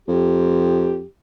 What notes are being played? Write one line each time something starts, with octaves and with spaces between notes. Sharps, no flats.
F2 G4